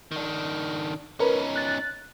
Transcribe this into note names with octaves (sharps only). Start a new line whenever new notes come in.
D#3 D4
C#4 D#4 A#4 B4
F#6 A6